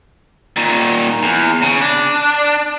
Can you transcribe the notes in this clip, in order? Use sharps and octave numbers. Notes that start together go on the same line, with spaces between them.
A#2 D#3
E2
C#3
D4